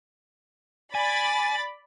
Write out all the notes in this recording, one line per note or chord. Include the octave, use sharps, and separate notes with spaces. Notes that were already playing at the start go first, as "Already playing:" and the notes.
D5 G#5 B5 A6